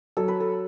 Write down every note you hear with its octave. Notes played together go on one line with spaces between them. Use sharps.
F#3 A4
B4
A4